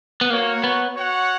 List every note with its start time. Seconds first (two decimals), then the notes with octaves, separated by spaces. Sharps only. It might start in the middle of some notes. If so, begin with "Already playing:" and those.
0.21 B3
0.30 A#3 F#4 A#4 C#5
0.64 B3
0.96 F#4 C#5 F#5